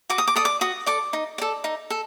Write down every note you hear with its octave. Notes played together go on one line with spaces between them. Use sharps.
F#4 D6
D#6
D6
A4 D5 D#6
D6
F#4 D#6
A4 D5 D6
D#4
A4 D5
D#4
A4